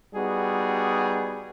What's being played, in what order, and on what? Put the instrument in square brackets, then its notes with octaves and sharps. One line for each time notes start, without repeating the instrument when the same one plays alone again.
[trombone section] G3 B3 D#4 F#4 G#4